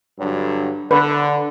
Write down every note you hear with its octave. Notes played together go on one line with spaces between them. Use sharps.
G2 D3 F#3
D3 B4